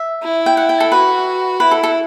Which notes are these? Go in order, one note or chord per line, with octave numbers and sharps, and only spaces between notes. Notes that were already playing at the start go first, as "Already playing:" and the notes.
Already playing: E5
E4
G5
F#5
G5
A4
F#4 B4
E4 B4
A4
A4